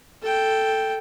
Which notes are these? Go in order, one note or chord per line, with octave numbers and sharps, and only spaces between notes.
A4 G5